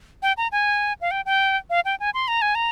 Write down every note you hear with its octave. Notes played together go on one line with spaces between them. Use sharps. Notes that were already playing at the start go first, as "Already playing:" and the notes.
G5
A#5
G#5
F5
G5
G5
F5
G5
G#5
C6
A#5
G#5
A#5